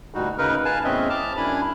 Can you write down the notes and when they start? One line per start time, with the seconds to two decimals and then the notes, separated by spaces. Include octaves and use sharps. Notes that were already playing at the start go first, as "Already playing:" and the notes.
0.14 D2 A#2 G3 D#4 F#4
0.38 C#3 D#4 A#4 B4
0.65 B4 F5 G#5 A5
0.84 E2 A2 C4 C#4 D#5 E5
1.10 A5 D6 F6
1.37 F#2 D4 E4 G#5 B5